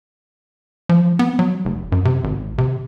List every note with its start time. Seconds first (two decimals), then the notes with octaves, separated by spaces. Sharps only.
0.89 F3
1.19 B3
1.39 F#3
1.65 F1
1.92 F#2
2.05 C3
2.24 G#1
2.58 C3